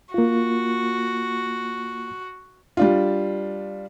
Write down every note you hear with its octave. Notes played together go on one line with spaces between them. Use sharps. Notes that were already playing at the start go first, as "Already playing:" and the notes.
A#3 F4 F#4
G3 D4 F4